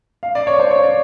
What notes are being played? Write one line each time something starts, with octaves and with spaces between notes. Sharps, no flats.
F5
D5
C#5
C5
C#5
D5